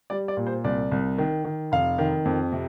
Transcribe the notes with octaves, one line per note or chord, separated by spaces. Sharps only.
G3 D5
D5
A#2
C5
C2 D5
C2
D#3
D#3
F1 F5
D#3
F2
C3